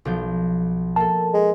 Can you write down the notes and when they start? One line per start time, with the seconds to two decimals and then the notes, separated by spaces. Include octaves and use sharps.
0.05 B1 F3 G6
0.96 A#3 A4 A5
1.34 G#3